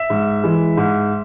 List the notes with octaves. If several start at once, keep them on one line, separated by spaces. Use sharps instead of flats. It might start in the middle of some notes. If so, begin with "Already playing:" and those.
Already playing: E5
G#2
E3 G#3
G#2